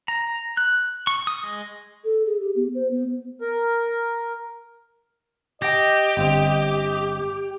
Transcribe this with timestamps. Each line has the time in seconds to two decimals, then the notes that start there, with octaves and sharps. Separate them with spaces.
0.08 A#5
0.57 F#6
1.07 C#6
1.27 D#6
1.44 G#3
2.05 A4
2.27 G#4
2.40 G4
2.56 B3
2.75 C5
2.91 B3
3.41 A#4
5.62 G4 D#5 G5 A#6
6.17 G1 C4